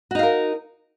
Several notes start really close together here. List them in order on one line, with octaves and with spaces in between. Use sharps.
F#4 D#4 F5 A#4